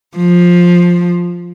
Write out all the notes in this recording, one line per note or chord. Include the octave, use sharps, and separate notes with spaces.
F3